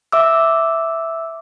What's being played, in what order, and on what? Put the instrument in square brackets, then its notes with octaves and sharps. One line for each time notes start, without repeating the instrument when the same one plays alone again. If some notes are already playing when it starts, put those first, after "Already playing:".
[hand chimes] E5 D6 E6